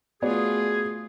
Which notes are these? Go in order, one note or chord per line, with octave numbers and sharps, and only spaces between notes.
A3 B3 F4 F#4 G#4 D5